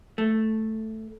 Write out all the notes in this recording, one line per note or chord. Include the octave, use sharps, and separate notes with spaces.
A3